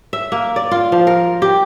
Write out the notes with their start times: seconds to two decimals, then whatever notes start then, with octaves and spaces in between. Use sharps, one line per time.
0.13 E5
0.32 A#3
0.56 D5
0.71 F4
0.92 F3
1.07 A#4
1.42 G4